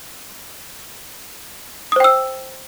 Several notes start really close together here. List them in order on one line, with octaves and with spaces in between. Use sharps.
D#6 C5 G5 E6